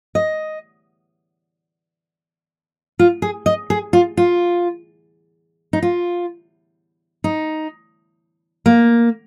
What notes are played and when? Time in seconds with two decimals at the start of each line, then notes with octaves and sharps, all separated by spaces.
0.15 D#5
2.99 F4
3.22 G#4
3.46 D#5
3.70 G#4
3.93 F4
4.17 F4
5.73 D#4
5.82 F4
7.24 D#4
8.66 A#3